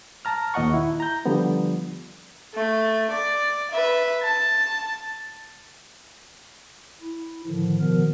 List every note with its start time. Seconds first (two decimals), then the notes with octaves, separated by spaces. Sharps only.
0.25 A5 A#5 F6
0.54 D#2 A#2 D#5 F#5 C#6
0.74 E4
1.00 A#5 G6
1.25 D3 F3 G3 B3
2.54 A3
3.11 D5
3.71 B4 E5
4.23 A5
7.01 E4
7.47 A2 D3 D#3 F3
7.80 B2 D#3 F3 B3 A#4